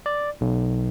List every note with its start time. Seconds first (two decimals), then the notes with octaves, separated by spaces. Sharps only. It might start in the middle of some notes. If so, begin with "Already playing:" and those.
0.06 D5
0.41 B1